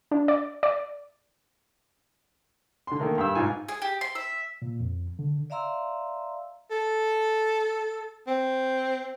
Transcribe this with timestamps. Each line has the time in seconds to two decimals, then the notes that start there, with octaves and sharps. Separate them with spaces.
0.11 D4
0.28 D5
0.63 D5
2.87 D3 C6
3.00 D#3 A3 A#3
3.18 G2 E6
3.35 G#2 D#4 F4 G#5
3.69 G#4
3.82 G4
4.01 C6
4.15 E5
4.62 A#2
4.80 F2
5.19 D3
5.50 D5 E5 F5 A#5 C6 E6
6.71 A4
8.27 C4